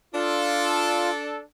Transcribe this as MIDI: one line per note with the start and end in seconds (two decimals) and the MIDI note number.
0.15 1.41 62
0.15 1.10 65
0.15 1.41 69